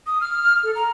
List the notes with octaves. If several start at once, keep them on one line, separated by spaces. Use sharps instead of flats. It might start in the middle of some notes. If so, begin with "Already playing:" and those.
D#6
F6
A4
A#5